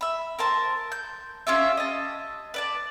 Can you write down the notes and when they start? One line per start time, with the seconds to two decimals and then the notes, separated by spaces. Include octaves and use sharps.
0.01 E5 B5
0.39 A#4 C5 A5
0.92 G6
1.47 C#4 F4 G4 E5
1.77 D#5 A5
2.54 B4 D5 A5